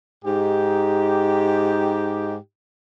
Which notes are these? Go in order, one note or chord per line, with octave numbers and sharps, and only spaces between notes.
G#2 D#4 G4